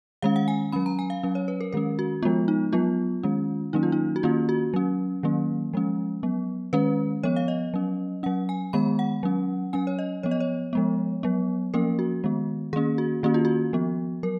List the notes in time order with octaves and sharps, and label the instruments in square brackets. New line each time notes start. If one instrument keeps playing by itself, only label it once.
[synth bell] D#3 G#3 C#4 F5
F#5
G#5
F#3 C#4 B5
A#5
G#5
F5
F#3 C#4
C#5
B4
A#4
D#3 G#3 C#4 A#4
F#4
F3 G#3 B3 F4
D#4
F#3 B3 F4
D#3 G#3 C#4
D#3 F#3 A#3 C#4 D#4
F4
D#4
F#4
D#3 A#3 C#4 F4
F#4
F#3 C#4
D#3 F#3 A#3 C#4
F3 G#3 C#4
F#3 B3
D#3 G#3 C#4 B4
F3 B3 C#5
F5
D#5
F#3 C#4
F#3 C#4 F#5
G#5
D#3 G#3 B3 B5
F#5
F#3 C#4
F#3 C#4 G#5
C#5
D#5
F3 B3 C#5
D#5
C#5
F3 G#3 B3
F#3 B3
F3 A#3 C#4 A#4
F#4
D#3 G#3 B3
D#3 A#3 C#4 G#4
F#4
D#3 A#3 C#4 F#4
F4
F#4
F3 B3
F#3 A#4